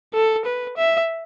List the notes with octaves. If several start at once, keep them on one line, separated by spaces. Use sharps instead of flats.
A4
B4
E5